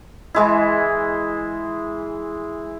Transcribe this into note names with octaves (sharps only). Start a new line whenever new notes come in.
E3 G#3 E4